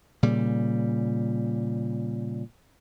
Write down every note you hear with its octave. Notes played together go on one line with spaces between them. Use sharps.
A#2 C#3 G3